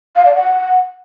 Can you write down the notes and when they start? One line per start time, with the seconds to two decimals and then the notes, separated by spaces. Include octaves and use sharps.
0.16 F5
0.25 D5
0.35 F#5